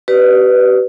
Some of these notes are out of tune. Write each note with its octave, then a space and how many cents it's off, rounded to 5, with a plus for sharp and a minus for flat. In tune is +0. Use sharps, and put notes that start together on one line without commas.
G4 -40 B4 +5 D5 +0